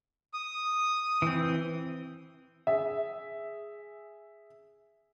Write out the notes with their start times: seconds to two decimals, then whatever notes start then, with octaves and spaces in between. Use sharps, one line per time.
0.34 D#6
1.22 E3 C4
2.67 G#4 E5